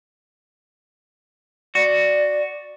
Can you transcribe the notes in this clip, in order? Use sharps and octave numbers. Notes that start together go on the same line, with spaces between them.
F#4 D5